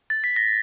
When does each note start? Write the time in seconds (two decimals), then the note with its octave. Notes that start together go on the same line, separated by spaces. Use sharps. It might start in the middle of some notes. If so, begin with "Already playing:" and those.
0.10 A6
0.24 B6
0.36 A#6